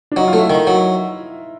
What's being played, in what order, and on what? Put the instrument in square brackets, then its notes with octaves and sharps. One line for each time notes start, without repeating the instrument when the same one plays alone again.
[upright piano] D4
[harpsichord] F#3 [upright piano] D#4
[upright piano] F4
[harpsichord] A3
[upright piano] E4
[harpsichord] D#3 [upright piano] D#4
[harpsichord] F#3